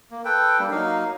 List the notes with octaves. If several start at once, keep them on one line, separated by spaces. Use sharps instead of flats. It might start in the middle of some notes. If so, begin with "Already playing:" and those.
A#3
A4 B4 G5
G3 A#3 D4
F#3 A#3 D#4 F5